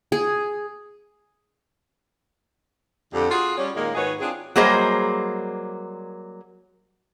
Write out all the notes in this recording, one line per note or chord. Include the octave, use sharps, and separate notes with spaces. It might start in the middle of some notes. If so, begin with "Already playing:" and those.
G#4
F2 D3 G4
F4 F#4 G#4
G3 C#4
A#2 D#3 G#3 A#3
G#2 D#3 F#4 G#4 B4 C#5
C4 D4 F4 G#4
F#3 G3 A#3 G#4 C5 D#5